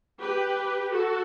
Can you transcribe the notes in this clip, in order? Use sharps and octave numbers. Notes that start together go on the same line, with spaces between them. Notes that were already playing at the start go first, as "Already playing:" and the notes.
G4 B4
F#4 A4